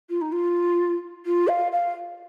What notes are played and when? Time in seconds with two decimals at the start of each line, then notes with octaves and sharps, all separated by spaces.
0.09 F4
0.21 D#4
0.32 F4
1.25 F4
1.47 F5
1.71 F5